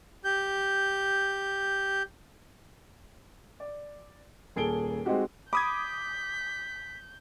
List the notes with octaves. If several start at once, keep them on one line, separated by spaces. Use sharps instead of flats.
G4 G6
D5
D#1 A#2 G#4 A4 D7 G7
G#3 C4 D#4 F#4 G4
B5 D6 D#6 G6 G#6 B6